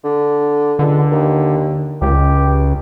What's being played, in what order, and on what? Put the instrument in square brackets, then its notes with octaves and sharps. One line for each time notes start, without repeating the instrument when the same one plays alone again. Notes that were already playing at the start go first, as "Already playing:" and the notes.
[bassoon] D3
[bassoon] C#2 [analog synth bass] D3
[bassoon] D#2
[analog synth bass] C#2 [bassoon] G4